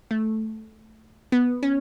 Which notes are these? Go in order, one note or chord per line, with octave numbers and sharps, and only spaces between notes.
A3
B3
C#4